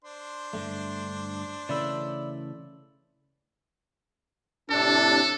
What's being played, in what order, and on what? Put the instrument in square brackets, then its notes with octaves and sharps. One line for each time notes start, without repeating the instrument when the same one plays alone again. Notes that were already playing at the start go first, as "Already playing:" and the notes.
[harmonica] D4 C5 C6
[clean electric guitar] G2 D3 A3
[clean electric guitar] C#3 E3 A3 [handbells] D5 B5 E6
[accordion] A2 C3 D4 [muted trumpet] A4